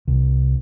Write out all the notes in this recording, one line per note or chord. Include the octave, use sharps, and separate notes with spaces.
C2